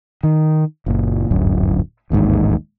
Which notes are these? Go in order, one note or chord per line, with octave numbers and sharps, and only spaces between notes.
D#3
F#1 A#2
D1 G1 F#2
D1 A1 D#2 G#2